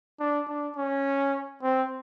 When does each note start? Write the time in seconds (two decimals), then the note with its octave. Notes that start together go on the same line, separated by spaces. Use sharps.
0.20 D4
0.48 D4
0.76 C#4
1.63 C4